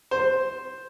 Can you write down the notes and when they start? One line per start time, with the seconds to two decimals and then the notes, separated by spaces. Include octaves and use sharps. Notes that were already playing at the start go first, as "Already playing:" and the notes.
0.11 C5